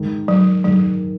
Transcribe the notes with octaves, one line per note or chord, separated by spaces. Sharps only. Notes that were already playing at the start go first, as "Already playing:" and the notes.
Already playing: G#2 D#3 G#3
F#3
G#2 D#3 F#3 G#3